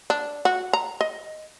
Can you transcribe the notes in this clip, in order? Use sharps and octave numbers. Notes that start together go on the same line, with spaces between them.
D4
F#4
A#5
D#5